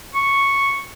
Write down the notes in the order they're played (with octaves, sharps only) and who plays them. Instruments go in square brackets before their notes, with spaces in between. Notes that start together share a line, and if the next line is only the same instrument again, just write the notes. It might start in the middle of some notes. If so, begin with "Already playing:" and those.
[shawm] C#6